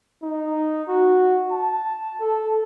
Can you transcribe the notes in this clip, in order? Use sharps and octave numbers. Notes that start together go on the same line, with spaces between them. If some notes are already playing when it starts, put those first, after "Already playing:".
D#4
F#4
A5
A4